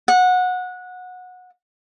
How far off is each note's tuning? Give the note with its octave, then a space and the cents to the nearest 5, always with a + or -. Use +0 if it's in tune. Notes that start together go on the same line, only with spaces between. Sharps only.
F#5 -20